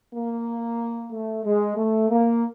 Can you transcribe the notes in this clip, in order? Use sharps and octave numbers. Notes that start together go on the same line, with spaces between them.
A#3
A3
G#3
A3
A#3